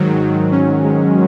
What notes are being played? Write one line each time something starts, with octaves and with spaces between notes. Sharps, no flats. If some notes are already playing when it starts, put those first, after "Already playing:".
Already playing: G#2 D#3 F#3
C#4
G#3